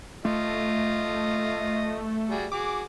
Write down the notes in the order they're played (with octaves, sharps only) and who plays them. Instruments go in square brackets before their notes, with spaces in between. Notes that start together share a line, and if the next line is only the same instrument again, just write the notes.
[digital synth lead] A3 [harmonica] F4 D#5
[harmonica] G3 F#4 G#4
[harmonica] F#4 G#4 [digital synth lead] D6